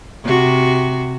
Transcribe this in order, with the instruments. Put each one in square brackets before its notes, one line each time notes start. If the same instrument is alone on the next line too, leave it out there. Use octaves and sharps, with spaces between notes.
[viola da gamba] C3 F#4